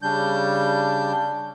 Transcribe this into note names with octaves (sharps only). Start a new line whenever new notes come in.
C#3 G3 D4 G6